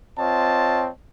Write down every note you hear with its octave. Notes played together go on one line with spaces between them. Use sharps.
C4 F4 C#5 D#5 A5